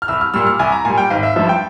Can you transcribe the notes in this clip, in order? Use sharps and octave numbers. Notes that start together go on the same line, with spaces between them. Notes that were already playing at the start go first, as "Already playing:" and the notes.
F6
C2 E6
F6
A#2 G3 E6
F6
C2 G#5
A#5
A#2 G3 G#5
G5
G#1 F5
E5
G2 F3 E5
G5